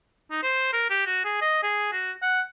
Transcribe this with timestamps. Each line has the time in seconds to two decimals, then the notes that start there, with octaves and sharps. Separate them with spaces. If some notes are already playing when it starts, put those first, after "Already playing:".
0.31 D#4
0.43 C5
0.73 A#4
0.90 G4
1.07 F#4
1.25 G#4
1.41 D#5
1.63 G#4
1.92 F#4
2.22 F#5